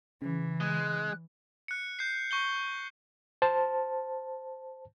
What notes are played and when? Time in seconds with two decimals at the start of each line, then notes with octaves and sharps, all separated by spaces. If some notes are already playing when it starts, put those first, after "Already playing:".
0.22 C#3 E3
0.61 G#3 F#6
1.68 F#6 C#7
1.99 G6 C7
2.31 C#6 G6 G7
3.42 C5 A5